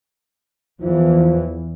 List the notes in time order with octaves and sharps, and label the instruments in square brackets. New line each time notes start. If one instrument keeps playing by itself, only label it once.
[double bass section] E2 E3 [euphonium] F3